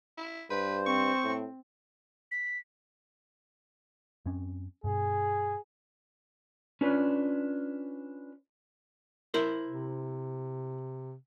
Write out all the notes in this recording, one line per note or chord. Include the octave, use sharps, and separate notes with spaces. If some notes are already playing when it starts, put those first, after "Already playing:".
E4
G2 B4 C5
C4 C#6
A2
B6
F#2 C4 C#4
G2 B2 G#4
C#4 D4 F4 B4
E4 A#4 C5
C3